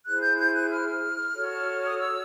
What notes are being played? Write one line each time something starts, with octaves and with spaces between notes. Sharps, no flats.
E4 G#4 C5 F#6
G6
G6
F#6
F6
F#4 A4 C#5
D#6
E6